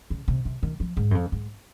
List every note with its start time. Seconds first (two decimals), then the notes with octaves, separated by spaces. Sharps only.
0.10 C#3
0.28 C3
0.45 C3
0.63 D#3
0.80 F3
0.97 G#2
1.11 F#2
1.15 F2
1.32 G#2